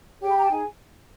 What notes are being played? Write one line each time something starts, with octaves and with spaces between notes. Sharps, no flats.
G4 G#4 C#5 G5
B5
A#5
A5
D#4 G#4 G#5